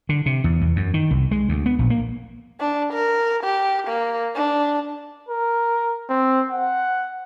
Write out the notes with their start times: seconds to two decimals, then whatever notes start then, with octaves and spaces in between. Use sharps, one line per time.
0.09 D3
0.26 C3
0.44 E2
0.61 E2
0.76 F#2
0.94 D#3
1.11 C2
1.31 G#3
1.49 D2
1.66 B3
1.79 A#1
1.90 A#3
2.60 D4
2.93 A#4
3.43 G4
3.87 A#3
4.35 D4
5.29 A#4
6.09 C4
6.50 F#5